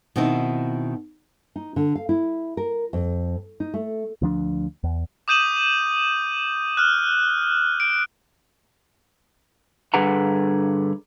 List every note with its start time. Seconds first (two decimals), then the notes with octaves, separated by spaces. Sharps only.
0.16 B2 D#3 C4 D#4 E4
1.56 D#4
1.76 D3
1.95 F5
2.09 E4
2.57 A#4
2.93 F2
3.60 D#4
3.74 A3
4.22 D2 F3 D4
4.84 E2
5.28 D6 D#6 G6 D#7 E7 F#7
6.77 F6 F#6
7.80 D7
9.94 G2 D3 G#4 B4 F#5 A#5